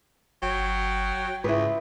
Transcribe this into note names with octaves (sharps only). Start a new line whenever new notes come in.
G1 F#3 G5
C#2 G#2 E4 B4